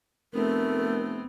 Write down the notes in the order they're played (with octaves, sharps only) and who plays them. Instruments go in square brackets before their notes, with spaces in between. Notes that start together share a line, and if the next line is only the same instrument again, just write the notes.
[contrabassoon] F1 [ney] A3 [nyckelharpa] B3 C4 [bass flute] A#4